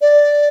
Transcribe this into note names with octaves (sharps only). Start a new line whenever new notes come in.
D5